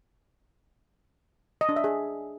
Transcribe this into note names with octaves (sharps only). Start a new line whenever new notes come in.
D#5
D4
E5
G#4